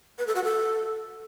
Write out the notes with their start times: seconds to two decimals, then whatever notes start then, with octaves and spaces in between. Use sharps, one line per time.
0.18 B4
0.27 A4
0.35 F#4
0.44 A4